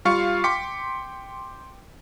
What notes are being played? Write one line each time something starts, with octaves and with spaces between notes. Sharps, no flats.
G3 F4 F5 C#6 C#7
G5 C6 D6 B6 C#7